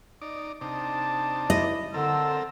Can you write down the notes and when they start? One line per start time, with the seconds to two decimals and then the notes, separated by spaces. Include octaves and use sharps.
0.22 D#4 D5
0.61 C3 D4 D#4 A5
1.50 E4 D#5
1.94 D3 C4 A4 A#4 E6